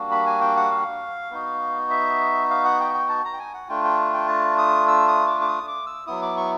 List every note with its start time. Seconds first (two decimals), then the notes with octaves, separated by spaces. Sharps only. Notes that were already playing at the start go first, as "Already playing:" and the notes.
Already playing: G3 A#3 D4 F#4
0.11 B5
0.26 G#5
0.41 G5
0.57 F#5
0.71 F5
1.31 B3 D#4 F#4
1.90 E5
2.50 F5
2.65 F#5
2.80 G5
2.94 G5
3.09 A5
3.25 A#5
3.33 G5
3.39 G#5
3.54 F#5
3.69 A3 D4 F4 G5
3.84 G5
4.14 G5
4.28 A5
4.58 D#6
4.88 E6
5.08 D#6
5.27 D6
5.41 D6
5.48 D#6
5.67 D6
5.87 E6
6.06 F#3 B3 E4 D#6
6.22 D6
6.37 C#6